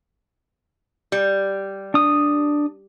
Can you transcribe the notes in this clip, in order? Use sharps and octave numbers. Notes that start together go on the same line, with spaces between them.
G3
D4 D#6